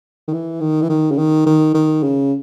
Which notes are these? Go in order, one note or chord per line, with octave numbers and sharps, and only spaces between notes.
D#3
E3
D#3
E3
D#3
C#3
D#3
D#3
D#3
C#3